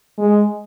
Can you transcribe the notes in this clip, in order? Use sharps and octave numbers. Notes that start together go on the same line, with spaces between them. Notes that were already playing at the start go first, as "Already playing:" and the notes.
G#3